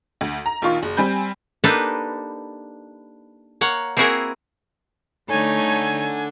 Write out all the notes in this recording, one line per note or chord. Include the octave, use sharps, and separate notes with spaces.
D2
A#5
A#1 D#3 F4 C#6
F#1
G3 C4 G#5 B5 G6
A#3 D4 D#4 G4 A4 B4
A#3 C#5 F#5
A#3 C4 E4 F#4 G#4 A#4
A3 D4 D#4 A4 C#5 G#5